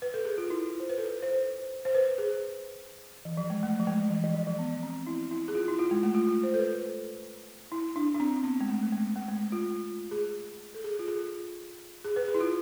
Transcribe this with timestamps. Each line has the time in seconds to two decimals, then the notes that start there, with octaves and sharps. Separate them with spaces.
0.02 B4
0.14 A4
0.25 G#4
0.38 F4
0.50 E4
0.80 C5
0.89 B4
0.98 A4
1.22 C5
1.85 C5
1.95 B4
2.18 G#4
3.25 E3
3.37 F3
3.50 G#3
3.63 A3
3.79 F3
3.87 G#3
4.10 E3
4.24 E3
4.35 F3
4.47 F3
4.59 B3
4.83 C4
5.07 E4
5.31 E4
5.48 G#4
5.55 F4
5.68 E4
5.79 F4
5.91 G#3
6.03 A3
6.15 F4
6.27 F4
6.43 C5
6.54 A4
6.59 B4
7.72 E4
7.96 D4
8.14 D4
8.20 C4
8.44 B3
8.61 G#3
8.68 A3
8.83 A3
8.92 G#3
9.16 A3
9.28 G#3
9.52 F4
10.11 G#4
10.74 A4
10.84 G#4
10.99 F4
11.08 G#4
12.04 G#4
12.16 B4
12.28 G#4
12.34 E4
12.40 F4